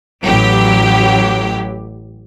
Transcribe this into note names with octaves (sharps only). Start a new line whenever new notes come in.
A1 F#3 G4